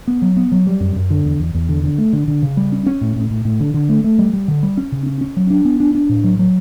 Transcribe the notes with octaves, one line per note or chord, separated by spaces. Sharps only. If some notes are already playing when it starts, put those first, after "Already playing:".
B3
F#3
B3
F#3
G3
F#2
F#2
D3
E2
E2
E2
D3
D3
A3
D3
D3
C#3
G3
C#4
C#4
A2
A2
A2
A2
D3
D3
A3
A3
G3
G3
D3
G3
C#4
C#3
C#4
C#4
F#3
D4
B3
D4
D4
A2
F#3
F#3